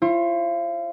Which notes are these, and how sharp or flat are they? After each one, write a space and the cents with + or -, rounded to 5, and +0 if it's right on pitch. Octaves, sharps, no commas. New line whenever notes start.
F4 -40 C5 +40